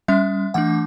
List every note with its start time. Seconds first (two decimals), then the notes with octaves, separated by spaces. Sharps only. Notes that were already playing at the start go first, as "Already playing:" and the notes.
0.08 G3 C#4 E5
0.54 E3 A3 D4 F#5